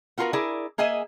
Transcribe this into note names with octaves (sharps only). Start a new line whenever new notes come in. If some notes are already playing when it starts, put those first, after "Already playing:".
B3 F4 F#4 G#4 A#4
E4 G#4 A#4 D5
A#3 G#4 D#5 E5 G#5